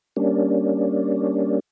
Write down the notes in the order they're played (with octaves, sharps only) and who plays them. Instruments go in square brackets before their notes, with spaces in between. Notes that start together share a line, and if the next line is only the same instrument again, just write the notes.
[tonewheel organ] G3 A#3 C#4 D4